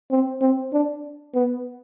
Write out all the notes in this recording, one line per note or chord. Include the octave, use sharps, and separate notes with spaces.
C4
C4
D4
B3